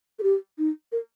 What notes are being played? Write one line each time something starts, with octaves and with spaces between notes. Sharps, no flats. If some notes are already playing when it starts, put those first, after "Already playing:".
A4
G4
D#4
A#4